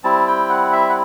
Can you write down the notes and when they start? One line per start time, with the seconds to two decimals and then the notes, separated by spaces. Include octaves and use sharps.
0.04 G3 C4 E4 A5
0.27 G5
0.50 F#5
0.72 E5
0.89 F#5